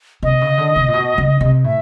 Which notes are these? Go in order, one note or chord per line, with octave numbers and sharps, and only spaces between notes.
C3 D#5
C#3
D3
C3
A#2
B2
C#3
C3
A2 E5